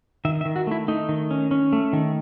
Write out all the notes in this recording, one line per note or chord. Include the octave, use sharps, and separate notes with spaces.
D#3 E5
E5
D#3
F#4
A3 E4
A3 D#4
D#3
C#4
C#4
A3
D#3